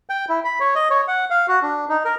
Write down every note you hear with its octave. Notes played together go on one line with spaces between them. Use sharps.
G5
E4
B5
C#5
D#5
C#5
F#5
F5
F#4
D4
D#4
A#4